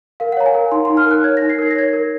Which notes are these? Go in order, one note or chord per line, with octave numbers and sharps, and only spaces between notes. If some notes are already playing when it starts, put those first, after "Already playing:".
A#4 F5
F#5
C#5 A#5
G#5
A#4
D#4 C6
C6
D#4
F6
A#4 F#6
C#5 G#6
A#6
D#4
C7
A#4 G#6
A#6
C#5 G#6
A#4